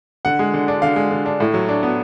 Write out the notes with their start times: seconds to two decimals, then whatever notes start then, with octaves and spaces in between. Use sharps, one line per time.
0.25 D3 F#5
0.39 G#3
0.54 D3
0.68 D4
0.82 D3 F5
0.96 G#3
1.11 D3
1.26 D4
1.40 A2
1.54 F#3
1.69 D4
1.83 B3